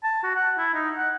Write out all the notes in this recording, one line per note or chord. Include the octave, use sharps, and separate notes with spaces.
A5
F#4
F#5
E4
D#4
F#5